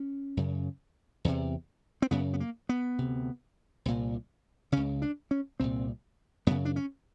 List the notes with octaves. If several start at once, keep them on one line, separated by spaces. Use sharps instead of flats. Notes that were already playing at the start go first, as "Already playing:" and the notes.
Already playing: C#4
F#2 C#3
E2 C3
C4
F#2 C#3 B3
B3
A#3
B3
D2 C3
C2 A#2
C#2 C#3 C#4
D4
C#4
C2 A#2 C4
F#2 C#3 B3
D4
C#4